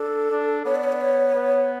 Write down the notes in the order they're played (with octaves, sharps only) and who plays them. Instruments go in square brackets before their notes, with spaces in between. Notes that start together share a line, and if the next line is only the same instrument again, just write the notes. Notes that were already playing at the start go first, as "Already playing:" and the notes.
Already playing: [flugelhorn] D4 [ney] A4
[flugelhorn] D4
[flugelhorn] B3 [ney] C#5
[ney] D5
C#5
D5
C#5
[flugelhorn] B3